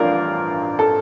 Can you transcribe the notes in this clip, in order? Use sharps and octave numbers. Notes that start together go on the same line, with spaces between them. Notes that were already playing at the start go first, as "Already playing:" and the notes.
Already playing: A1 G2 F3 A#4 D5 F5
A4